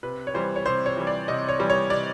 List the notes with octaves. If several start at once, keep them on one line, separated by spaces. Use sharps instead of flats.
C3 B4
C#5
E3 G3 C5
C#5
C3 C5
C#5
E3 G3
D5
C3 D#5
C#5
E3 G3
C#5
C3 D5